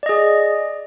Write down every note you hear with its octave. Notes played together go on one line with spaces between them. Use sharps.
G#4 D5 D#5